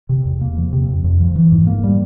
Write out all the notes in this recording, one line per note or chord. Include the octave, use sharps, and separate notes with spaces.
C3
E2
A#3
F3
C3
F2
F2
F3
E3
G#2
A#3
G3